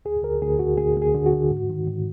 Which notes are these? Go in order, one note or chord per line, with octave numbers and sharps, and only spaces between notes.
D2 G#4
D2 A#4
D2 G#4
D2 F#4
D2 G#4
D2
G#4
D3
F#4
D3
G#2
D#3
G#2